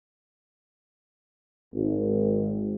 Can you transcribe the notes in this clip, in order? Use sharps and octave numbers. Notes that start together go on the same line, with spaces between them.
G#1